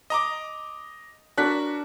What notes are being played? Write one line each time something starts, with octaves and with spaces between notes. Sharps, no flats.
D#5 A#5 D6
D4 F#4 A#4 F#6 B6